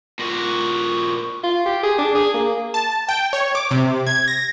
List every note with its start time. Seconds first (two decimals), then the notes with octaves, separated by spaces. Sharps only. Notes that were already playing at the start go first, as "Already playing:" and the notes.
0.19 A#2 F#4
1.43 F4
1.65 G4
1.83 G#4
1.98 D4
2.15 G#4
2.34 A#3
2.74 A5
3.09 G5
3.33 C#5
3.55 D6
3.71 C3
4.07 G#6
4.28 A#6